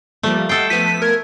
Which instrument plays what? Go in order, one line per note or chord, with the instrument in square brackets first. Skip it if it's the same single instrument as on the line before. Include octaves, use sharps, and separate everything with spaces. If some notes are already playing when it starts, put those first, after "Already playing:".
[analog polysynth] F3 G3 A#3 [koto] A3
[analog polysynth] G3 D#5 F#5 [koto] A4 G5 [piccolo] C7
[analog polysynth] F3 A3 B3 [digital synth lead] B6 [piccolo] D#7
[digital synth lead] A#4 [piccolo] G#6